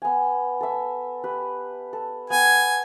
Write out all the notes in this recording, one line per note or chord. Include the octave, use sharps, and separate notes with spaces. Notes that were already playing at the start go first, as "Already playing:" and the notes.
B3 G#5
A4 E5
G4 B4
A4
B3 G5 G#5